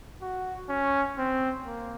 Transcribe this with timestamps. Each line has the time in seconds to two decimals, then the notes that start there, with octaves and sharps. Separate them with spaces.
0.22 F#4
0.69 C#4
1.18 C4
1.66 A#3